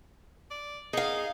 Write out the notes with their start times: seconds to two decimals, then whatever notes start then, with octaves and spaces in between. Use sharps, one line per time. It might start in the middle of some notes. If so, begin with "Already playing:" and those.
0.51 D5
0.93 D#4 G#4 F5